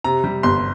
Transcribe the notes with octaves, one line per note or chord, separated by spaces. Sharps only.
C3 A#5
G3
G1 C6